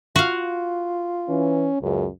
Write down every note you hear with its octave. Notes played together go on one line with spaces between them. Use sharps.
F4 F#4 F5
E3 C#4
C#2 F#2